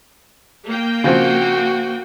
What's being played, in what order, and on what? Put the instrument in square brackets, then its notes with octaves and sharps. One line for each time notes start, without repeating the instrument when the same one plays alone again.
[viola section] A#3 G5
[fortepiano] C#3 F3 C4 [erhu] F#4